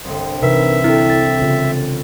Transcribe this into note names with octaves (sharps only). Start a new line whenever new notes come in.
G1 C2
C3 E3 D#4 A#4 B4 E5
C4 E4 G4 A4
A6
C#3 F4 C#5